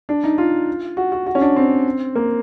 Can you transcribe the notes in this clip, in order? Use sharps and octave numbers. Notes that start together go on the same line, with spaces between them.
D4
D#4
F4
F#4
F#4
F#4
C#4
D4
C4
A#3